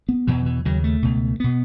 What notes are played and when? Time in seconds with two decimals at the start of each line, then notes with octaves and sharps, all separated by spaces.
0.09 B3
0.27 E2 B2 E3
0.46 E3
0.65 D#2 C#3 F#3
0.84 A3
1.02 C#2 B2
1.40 B2 B3